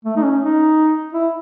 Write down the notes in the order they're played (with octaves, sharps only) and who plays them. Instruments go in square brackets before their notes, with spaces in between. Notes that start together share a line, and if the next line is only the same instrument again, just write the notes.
[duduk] A3
D#4
C#4
D#4
E4